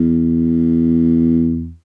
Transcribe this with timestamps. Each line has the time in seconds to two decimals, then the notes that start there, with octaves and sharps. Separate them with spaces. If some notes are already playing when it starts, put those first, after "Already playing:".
Already playing: E2